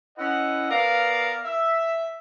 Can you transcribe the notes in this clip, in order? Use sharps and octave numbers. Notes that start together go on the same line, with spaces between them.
C#4 E4 B4 D#5 F#5
B3 A#4 D5 F5
E5